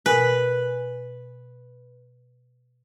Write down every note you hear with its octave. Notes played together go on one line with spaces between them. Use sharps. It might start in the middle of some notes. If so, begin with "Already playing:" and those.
B2 A#4 B4 G#5